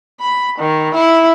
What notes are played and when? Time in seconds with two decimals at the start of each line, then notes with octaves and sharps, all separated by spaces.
0.21 B5
0.58 D#3
0.94 E4